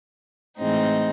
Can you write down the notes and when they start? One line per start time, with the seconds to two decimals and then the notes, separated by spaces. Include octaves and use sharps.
0.58 A2 E3 G#3 C4 D#4